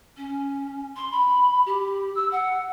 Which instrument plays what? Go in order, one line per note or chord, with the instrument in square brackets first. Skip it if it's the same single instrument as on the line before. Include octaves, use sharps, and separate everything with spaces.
[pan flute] C#4
C6
B5
G4
E6
F#5